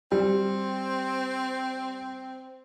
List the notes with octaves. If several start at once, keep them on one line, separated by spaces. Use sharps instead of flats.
G3 C4